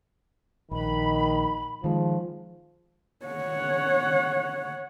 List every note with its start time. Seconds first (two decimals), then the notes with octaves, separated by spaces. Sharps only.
0.71 A#1 D#3 B5
1.84 D#3 F3 G#3
3.26 C#5 F#5